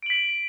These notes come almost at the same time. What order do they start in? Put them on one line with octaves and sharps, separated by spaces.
D7 F#7 B6